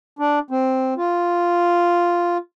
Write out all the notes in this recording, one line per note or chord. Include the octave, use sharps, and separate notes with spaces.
D4
C4
F4